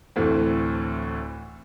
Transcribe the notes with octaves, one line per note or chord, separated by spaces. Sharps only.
D2 A2 E3 A3 C4